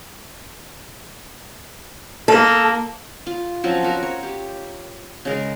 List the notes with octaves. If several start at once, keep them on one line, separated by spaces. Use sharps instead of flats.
A#3 A4
F4
F3 F#3 C4 C#4
F4 F#4 A#4
C#5
G4
C#3 G#3 A#4